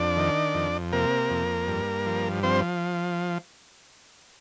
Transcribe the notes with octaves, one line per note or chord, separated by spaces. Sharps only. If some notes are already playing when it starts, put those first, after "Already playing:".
Already playing: F2 D4 D5
D#3
F2
C3 A#3 A#4
F2
G2
F3
F3 C4 C5